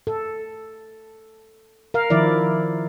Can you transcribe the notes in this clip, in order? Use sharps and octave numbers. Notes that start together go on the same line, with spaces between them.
A4
A#4 F5
D#3 F3 E4 D5